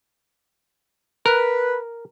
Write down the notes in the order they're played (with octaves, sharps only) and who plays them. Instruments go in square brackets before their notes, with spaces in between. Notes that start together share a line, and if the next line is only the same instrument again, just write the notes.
[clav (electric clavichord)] A#4 [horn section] B4